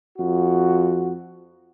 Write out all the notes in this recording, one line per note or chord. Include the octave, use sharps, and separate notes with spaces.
F2 F#4